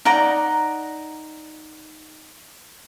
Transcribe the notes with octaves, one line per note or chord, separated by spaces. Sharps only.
D#4 D5 F#5 A#5